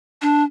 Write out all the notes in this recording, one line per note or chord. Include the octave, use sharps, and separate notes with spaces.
D4